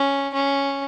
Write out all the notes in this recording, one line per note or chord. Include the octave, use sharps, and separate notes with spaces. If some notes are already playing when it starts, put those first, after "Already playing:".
Already playing: C#4
C#4